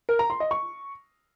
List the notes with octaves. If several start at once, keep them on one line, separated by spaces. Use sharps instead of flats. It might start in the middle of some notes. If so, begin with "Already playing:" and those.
A#4
A#5
C6
D#5
C#6